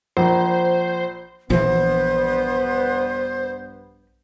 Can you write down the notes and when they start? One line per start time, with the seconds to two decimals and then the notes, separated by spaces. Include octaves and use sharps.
0.17 A#1 C5
1.50 A#1 G2 E3 B3 C5